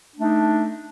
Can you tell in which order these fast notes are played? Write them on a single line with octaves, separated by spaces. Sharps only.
D4 A3 D#4